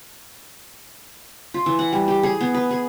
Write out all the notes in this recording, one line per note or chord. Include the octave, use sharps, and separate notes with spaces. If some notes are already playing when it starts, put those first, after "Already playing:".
F4
E3
F#5
G3
G4
G#4
B3
B4
G#4